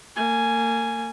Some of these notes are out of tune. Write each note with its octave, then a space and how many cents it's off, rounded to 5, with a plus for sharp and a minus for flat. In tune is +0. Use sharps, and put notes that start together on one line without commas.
A#3 -30 G#5 +0